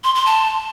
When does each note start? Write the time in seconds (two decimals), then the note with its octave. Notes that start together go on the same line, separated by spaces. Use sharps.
0.04 C6
0.15 C6
0.26 A5